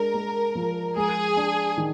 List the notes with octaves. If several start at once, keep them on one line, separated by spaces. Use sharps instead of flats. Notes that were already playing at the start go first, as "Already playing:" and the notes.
Already playing: G#3 D4 A#4
G#3
F3
G#3 G#4
D4
D#3